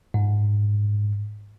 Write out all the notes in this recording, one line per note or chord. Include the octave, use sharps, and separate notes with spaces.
G#2